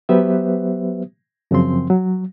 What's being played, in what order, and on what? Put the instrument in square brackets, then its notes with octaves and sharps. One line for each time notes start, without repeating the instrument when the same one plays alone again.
[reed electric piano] F#3 B3 G4 B4 C5 E5
F#2 C#3 F3 C4 C6
F#3